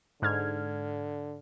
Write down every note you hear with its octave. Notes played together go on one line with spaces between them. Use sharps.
G#2 D3 F6 G#6